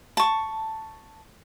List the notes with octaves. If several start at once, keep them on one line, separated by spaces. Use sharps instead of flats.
A5 C#6